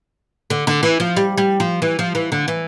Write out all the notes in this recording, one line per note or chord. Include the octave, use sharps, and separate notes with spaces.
D3
D3
E3
F3
G3
G3
F3
E3
F3
E3
D3
E3